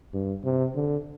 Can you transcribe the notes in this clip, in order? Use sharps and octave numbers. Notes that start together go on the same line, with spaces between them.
G2
C3
D3